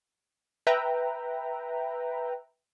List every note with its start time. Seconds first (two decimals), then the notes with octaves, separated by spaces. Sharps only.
0.67 B4 E5 G5 A#5